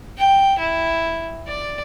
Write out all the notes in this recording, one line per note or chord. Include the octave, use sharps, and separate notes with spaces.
G5
E4
D5